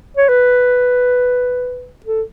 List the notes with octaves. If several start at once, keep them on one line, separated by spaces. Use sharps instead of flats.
C#5
B4
A4